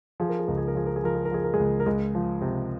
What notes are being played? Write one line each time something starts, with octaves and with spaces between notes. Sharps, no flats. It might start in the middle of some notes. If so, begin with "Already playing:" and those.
F3 G#4
A#4
G#4
C#2 A#4
G#4
A#4
F3 G#4
A#4
G#4
F3 A#4
G#4
A#4
F3 G#4
A#4
G#3 G#4
C#2
A#4
C#2 G#3 G#4
F3
C3